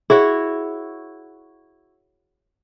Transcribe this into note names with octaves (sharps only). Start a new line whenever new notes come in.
E4 F#4 G#4 C#5